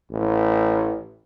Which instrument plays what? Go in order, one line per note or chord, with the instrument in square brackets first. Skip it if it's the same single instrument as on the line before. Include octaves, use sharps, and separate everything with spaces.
[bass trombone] A1